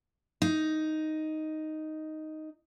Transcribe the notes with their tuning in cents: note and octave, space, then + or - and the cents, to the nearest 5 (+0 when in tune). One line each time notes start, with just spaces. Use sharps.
D#4 +0